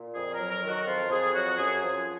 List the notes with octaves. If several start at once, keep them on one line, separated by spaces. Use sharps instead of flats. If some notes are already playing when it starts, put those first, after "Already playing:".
Already playing: A#2
F2 G#4
A#4
F#3
A#4
D#3
F#4
F2 F4
F2 G#4
F#3 F#4
F#2 G#4
F3 G#4